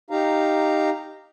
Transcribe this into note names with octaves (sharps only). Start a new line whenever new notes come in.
D#4 G4 F5 A#5